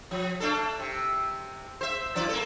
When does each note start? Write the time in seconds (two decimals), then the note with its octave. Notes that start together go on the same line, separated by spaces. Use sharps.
0.11 F3
0.40 A3 D4 A4
0.79 C3
1.81 C5 E5
2.15 F#2 E3 D5
2.29 A#3 A4